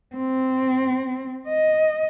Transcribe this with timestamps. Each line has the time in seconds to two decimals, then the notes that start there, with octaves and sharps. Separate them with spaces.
0.16 C4
1.48 D#5